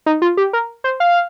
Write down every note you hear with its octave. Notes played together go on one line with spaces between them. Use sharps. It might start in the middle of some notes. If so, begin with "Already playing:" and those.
D#4
F4
G4
A#4
C5
F5